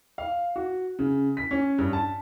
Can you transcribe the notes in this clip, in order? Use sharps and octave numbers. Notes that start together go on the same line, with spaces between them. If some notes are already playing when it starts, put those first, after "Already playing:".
F5
F#4
C#3
B6
C#4
G2
A5